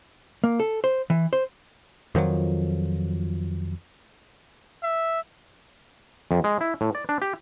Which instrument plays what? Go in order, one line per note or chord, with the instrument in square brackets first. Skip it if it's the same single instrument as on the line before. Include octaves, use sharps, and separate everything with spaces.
[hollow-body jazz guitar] A#3
A4
C5
E3
C5
[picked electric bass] F2 D#3 F3 F#3
[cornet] E5
[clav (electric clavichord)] F2
G#3
E4
A2
D5
D4
G4